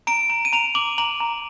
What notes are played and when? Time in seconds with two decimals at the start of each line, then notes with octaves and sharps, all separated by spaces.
0.07 A#5 D7
0.30 A#5
0.45 D#7
0.53 A#5 F7
0.75 D6 F#7
0.98 A#5 F#7
1.20 A#5